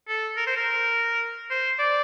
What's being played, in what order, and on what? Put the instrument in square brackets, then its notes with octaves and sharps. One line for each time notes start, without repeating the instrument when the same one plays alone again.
[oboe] A4
A#4
C5
A#4
C5
D5